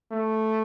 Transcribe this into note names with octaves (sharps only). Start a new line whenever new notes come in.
A3